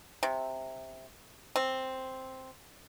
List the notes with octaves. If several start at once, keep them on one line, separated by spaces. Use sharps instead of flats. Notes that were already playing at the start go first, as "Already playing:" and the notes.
C3
C4